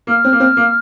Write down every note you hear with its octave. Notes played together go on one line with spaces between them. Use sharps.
A#3 F6
C4
A#3
C4
A#3